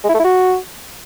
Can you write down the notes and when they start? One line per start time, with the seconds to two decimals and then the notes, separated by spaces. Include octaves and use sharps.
0.04 G#3
0.09 E4
0.14 A3
0.19 E4
0.24 F#4